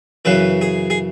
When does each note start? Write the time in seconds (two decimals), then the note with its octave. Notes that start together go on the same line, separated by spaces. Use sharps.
0.25 F#2 C#3 E3 B4
0.61 G#4
0.90 G#4